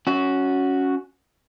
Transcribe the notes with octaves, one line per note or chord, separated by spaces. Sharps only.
C#4 F#4